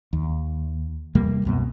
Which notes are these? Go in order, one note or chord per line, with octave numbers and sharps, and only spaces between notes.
D#2
E2 C3 G3 A#3
C2 F#2 B2